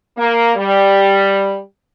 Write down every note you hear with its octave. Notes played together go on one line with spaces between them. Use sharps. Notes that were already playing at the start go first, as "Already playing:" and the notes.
A#3
G3